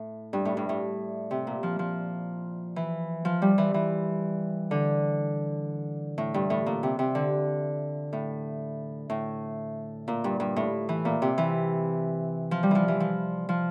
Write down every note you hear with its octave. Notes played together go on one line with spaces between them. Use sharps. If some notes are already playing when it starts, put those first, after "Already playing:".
Already playing: A2
G2
A2
G2
A2
C3
A#2
F3
F3
E3
F3
G3
E3
E3
D3
A2
G2
A2
A#2
C3
C3
D3
A2
A2
A#2
G2
G2
A2
E3
A#2
C3
E3
F3
G3
E3 F3
E3
F3
F3